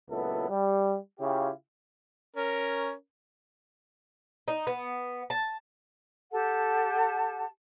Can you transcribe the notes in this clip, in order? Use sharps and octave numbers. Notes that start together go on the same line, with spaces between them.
C#2 A#2 F#3 B3 E4 A4
G3
C#3 E4 F4 G4
C#4 A#4
D#4
B3
A5
G4 A4 F#5 A5